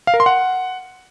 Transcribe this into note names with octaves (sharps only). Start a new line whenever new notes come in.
F5
A#4
C6
F#5